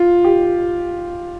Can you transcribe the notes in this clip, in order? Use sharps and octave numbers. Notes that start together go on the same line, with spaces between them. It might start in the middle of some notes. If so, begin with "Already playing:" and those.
Already playing: F4
G4